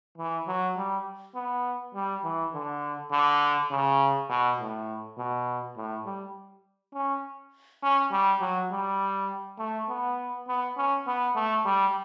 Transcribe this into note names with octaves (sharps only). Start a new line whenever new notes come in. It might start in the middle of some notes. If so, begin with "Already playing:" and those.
E3
F#3
G3
B3
G3
E3
D3
D3
C#3
B2
A2
B2
A2
G3
C#4
C#4
G3
F#3
G3
A3
B3
B3
C#4
B3
A3
G3